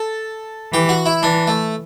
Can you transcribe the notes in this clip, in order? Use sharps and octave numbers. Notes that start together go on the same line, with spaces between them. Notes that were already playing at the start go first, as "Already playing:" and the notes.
Already playing: A4
E3 G4
F#4
E4
E3 D4
A3